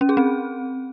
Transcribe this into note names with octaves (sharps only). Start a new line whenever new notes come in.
C#4
G#4
C4